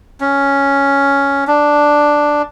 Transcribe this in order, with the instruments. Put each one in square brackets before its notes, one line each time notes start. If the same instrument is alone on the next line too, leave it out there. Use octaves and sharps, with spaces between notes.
[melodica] C#4
D4